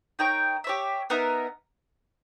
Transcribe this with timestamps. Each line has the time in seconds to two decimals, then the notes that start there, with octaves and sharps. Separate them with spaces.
0.19 D#4 A#4 C#5 G5
0.64 G4 C#5 E5
1.10 B3 D#4 A#4 E5